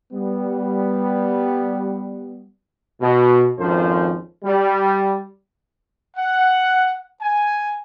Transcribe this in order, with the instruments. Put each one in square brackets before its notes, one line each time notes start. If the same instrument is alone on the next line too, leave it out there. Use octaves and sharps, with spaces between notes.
[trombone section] G3 B3
B2
G#1 F2 F3 C#4 A#4 C5
G3
[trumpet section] F#5
G#5